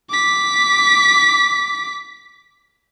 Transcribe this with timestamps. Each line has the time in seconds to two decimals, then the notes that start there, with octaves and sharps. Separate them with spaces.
0.10 D6 B6